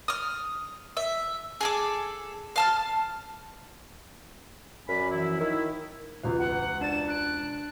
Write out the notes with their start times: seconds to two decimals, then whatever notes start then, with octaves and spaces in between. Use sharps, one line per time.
0.08 D#6 F6
0.97 E5
1.61 G#4 A4 D6
2.56 F5 A5 F6
4.88 F#2 D5 G#5 B5
5.11 E3 F3 E4
5.40 D#3 E4
6.23 E1 C#2 B4
6.39 F#5
6.81 D4 D5 A6 E7
7.08 D4 F#6 A6 D7